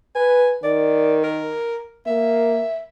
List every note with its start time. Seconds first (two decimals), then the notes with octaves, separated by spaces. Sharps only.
0.16 B4 G#5
0.63 D#3 D5
1.24 A#4
2.06 A#3 E5